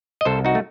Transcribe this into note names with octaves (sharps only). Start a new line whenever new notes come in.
D#5
C2 A4 C5
D#4 F#4
A3